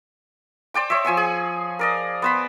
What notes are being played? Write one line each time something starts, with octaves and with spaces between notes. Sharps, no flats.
C5 D5 G5 D6
C5 C#5 D#5 E5
F3 G#5 C#6 E6
G#4
A#4 D5 D#5
B3 C5 B5